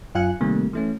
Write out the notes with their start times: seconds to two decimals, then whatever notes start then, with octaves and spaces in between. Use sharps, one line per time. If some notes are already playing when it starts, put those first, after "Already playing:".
0.15 F#2 F4 F5 G#5 F#6 C#7
0.41 C3 D#3 G3 A3 A#3
0.73 E3 A3 C#4